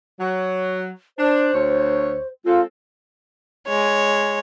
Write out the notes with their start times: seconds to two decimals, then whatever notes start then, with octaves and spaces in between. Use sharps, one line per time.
0.20 F#3
1.18 D4 C5
1.53 D2 C#5
2.45 G#3 C4 F4 A4
3.67 G#3 C#5